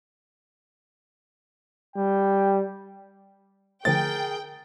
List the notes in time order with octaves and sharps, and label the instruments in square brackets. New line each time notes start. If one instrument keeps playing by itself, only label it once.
[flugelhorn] G3 [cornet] G5
[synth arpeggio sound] D3 F3 A3 [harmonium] G#4 A#4 [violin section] G5 [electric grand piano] A6